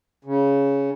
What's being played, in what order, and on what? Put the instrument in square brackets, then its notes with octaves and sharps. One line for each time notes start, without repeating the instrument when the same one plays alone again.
[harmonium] C#3